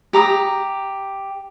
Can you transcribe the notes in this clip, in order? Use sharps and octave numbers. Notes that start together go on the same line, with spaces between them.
G4 A#5 D6 D#6